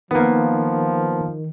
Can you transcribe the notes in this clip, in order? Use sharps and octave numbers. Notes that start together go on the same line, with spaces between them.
D#3 F3 A#3 B3